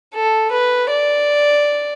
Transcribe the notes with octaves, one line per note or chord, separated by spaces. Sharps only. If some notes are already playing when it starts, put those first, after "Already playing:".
A4
B4
D5